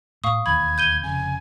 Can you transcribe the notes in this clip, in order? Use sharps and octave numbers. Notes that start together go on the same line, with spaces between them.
A2 F5 C#6 D#6
E1 D#2 D#3 B5 G#6
G6 D#7 G7
F1 C#3 G#5